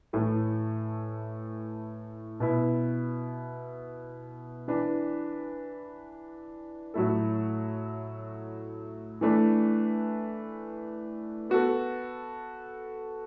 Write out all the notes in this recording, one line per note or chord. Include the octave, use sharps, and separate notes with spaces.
A2 E3 A3
B2 B3 E4
E3 D4 B4
A2 F#3 A3 E4 A4
E3 A3 D4 B4
B3 F#4 A4